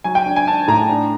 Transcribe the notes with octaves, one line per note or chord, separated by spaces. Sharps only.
F#3 G#5
G5
D4
G#5
D4 A5
A2 A#5
D4